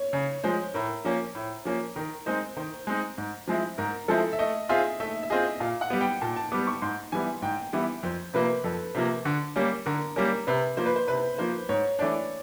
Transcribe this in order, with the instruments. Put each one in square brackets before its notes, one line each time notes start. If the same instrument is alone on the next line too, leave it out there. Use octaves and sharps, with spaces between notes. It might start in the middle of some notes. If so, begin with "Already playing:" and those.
Already playing: [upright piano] C#5
[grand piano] C#3
[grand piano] F3 G#3 [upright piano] C5
[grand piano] A2 [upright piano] A#4
[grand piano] F3 A#3 C#4
A2
F3 A#3 C#4
[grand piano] D#3 [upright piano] A#4
[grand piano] G#3 C4 D#4 [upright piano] C5
[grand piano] D#3 [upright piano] C5
[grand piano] G#3 C4 D#4
G#2
F3 G#3 C4 E4
[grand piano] G#2 [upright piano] A#4
[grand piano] F3 G#3 C4 E4 [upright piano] A4
[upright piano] E5
[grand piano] A3 [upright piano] D#5
[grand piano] C4 F4 G#4 [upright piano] E5
[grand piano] A3 [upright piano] E5
[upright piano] E5
[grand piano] C4 F4 G#4 [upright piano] D#5
[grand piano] A#2 [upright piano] F5
[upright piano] F#5
[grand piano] G3 B3
[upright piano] G5
[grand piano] A#2 [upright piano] A5
[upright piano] A5
[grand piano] G3 B3 [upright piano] D6
[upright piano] C#6
[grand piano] G#2 [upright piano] C6
[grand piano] E3 G3 B3 E4 [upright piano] G#5
[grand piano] G#2 [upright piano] G5
[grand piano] E3 G3 B3 E4
[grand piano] F2 [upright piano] C5
[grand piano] C3 F3 A#3 [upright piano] B4
[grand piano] F2 [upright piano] A4
[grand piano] C3 F3 A#3
D3
G3 A#3 C#4
[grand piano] D3 [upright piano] A#4
[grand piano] G3 A#3 C#4 [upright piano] A#4
[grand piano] C3 [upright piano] B4
[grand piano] F3 A#3 [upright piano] C5
[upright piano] B4
C5
[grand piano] C3 [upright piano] B4
[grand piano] F3 A#3 [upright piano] C5
[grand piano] G#2 [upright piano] C#5
[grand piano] E3 A3 D4 [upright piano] D5